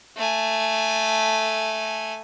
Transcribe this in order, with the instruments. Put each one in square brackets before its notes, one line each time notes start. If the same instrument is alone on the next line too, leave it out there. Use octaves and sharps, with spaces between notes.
[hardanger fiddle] A3 G#5